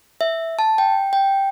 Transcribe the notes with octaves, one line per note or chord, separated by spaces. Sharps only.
E5
A5
G5
G5